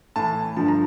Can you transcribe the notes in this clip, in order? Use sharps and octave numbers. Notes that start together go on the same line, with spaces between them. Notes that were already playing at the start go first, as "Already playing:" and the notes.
A2 E3 A5
G2 D3 F3 A5
A#5